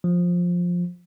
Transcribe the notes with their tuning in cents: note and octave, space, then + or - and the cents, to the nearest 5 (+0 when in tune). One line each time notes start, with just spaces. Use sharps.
F3 +10